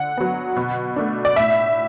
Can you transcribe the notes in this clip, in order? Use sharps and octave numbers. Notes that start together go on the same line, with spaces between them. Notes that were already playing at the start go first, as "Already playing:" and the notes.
Already playing: D3 F#5
F#3 B3
B2
A3 D4
D5
A2 E5